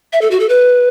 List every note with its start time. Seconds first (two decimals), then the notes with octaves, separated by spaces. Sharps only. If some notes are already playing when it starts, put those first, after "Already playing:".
0.13 E5
0.21 A4
0.31 F#4
0.40 A4
0.49 B4